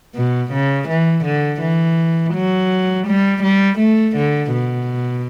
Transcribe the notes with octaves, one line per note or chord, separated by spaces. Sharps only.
B2
C#3
E3
D3
E3
F#3
G3
G3
A3
D3
B2